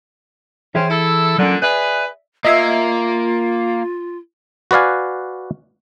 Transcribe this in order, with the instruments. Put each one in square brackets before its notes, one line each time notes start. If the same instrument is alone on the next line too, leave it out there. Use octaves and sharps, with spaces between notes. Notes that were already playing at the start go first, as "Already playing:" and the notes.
[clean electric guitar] E3 G#4 E5 [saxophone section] C4 C#4
[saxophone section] E4 A4
[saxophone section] A#2 D3 [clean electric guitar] F#3 C#4
[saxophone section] G#4 B4 [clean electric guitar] D5 E5
[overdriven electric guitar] A#3 [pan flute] F4 [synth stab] D#5 E5 G#6
[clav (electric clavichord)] F#4 B4 D5 F5 G#5